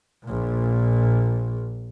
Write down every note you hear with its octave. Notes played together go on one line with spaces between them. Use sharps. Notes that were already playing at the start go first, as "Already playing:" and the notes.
A#1 A#2